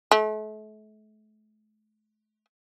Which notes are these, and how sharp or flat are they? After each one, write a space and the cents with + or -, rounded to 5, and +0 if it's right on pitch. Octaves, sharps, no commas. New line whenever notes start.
A3 -40